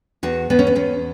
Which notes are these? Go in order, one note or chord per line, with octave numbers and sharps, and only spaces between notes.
E2 F#4
E2 B3
C#4
B3
E2 C#4